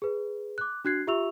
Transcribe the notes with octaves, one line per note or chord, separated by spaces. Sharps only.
G#4 B4
D6 F#6
D4 F#4 F#6 G#6 C7
F4 G4 E5 C#6 E6 F7